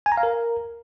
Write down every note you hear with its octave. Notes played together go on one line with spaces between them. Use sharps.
G#5
A#5
F5
A#4